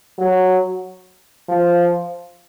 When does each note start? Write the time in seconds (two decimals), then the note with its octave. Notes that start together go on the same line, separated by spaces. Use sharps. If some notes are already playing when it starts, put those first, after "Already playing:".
0.19 F#3
1.49 F3